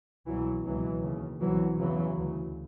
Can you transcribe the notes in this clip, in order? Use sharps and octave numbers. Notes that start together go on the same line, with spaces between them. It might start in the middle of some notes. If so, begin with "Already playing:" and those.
C2 B2 E3 F#3
C#2 B2 E3 F#3
D#2 C#3
C2 B2 E3 F#3
E2 C#3 E3 F#3
D2 C#3